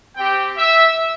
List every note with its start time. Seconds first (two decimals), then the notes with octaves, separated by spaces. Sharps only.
0.16 C4 G4 G5
0.57 E5